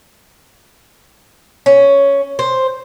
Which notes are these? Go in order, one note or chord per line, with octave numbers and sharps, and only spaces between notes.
C#4
C5